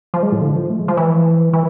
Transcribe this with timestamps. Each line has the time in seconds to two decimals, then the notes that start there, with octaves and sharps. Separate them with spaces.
0.14 F3
0.23 G#3
0.32 A2
0.41 D3
0.56 F3
0.70 A3
0.79 G#3
0.88 F3
0.97 E3
1.53 E3